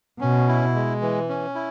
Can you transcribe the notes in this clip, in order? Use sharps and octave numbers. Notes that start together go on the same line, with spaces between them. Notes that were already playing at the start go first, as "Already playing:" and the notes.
B2 C#4
E4
G#3
E3
C#4
E4